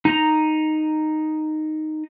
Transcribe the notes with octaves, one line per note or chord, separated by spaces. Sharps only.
D#4 A#5